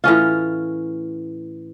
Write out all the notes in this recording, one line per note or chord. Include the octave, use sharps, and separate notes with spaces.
A2 E3 C#4 F4